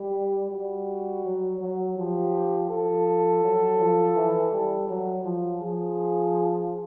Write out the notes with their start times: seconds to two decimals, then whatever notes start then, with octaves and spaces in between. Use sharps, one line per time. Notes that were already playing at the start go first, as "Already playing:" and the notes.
Already playing: G3 G4
0.51 G3 F#4
1.25 F#3
1.60 F#3
1.97 F3 G4
2.70 F3 A4
3.43 F#3
3.79 F3
4.16 E3
4.52 G3
4.89 F#3
5.25 F3
5.61 F3 G#4